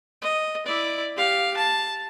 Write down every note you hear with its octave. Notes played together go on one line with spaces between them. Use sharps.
D#5
E4 D5
G4 F5
A5